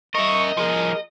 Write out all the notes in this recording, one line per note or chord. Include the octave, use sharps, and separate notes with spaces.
A#4 D#5 E5 C#6
F3 G#4 A#4